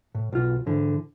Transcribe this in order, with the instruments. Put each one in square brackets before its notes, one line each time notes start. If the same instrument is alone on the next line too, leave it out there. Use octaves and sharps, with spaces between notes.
[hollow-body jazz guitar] A2
B1 F4
G#2 D3 E3